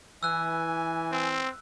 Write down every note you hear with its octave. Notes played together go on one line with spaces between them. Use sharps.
E3 G#5 E6 F#6
C4